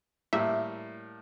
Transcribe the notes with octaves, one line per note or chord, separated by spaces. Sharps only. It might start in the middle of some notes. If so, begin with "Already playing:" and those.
A2 G3 A#3 E5